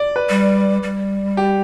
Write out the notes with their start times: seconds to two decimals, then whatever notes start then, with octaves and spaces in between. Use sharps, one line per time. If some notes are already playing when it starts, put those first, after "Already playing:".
Already playing: D5
0.16 B4
0.29 G3
0.83 G3
1.37 G4